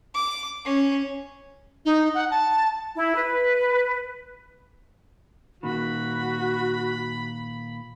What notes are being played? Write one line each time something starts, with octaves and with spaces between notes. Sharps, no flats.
D6
C#4
D#4
F#5
A5
E4
B4
A#2 D#3 F#4 B5